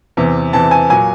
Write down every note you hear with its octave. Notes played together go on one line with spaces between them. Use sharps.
E2 C3 E3
E2 C3 E3 A5
G#5
A#2 F#3 G#5